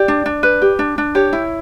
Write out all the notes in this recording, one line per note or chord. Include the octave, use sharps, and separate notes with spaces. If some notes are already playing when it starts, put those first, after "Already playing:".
Already playing: G4 D5
D4
D4
B4
G4
D4
D4
G4 C#5
E4